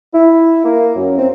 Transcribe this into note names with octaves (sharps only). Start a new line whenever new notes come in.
E4
A#3
F#2
C4